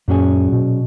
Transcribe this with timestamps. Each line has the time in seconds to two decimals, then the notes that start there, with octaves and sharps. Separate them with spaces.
0.08 F#2 A#2 F#3 C#4 G#4
0.52 B2